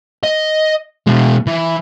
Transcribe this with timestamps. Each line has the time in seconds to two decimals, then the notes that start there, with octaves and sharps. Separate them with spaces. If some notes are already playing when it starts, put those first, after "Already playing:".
0.23 D#5
1.07 B2 G#3
1.47 E3